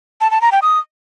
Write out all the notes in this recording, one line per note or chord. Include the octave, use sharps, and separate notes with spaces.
A5
A5
A#5
G5
D#6